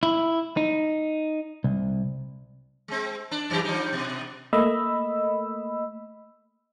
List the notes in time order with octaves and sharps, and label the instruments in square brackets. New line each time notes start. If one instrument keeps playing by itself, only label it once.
[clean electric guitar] E4
D#4
C2
[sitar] G#3 C4
D4
F#2 E3 G4
F3 G3 D#4
B2
[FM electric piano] A3 A#3 D#5 B5 E6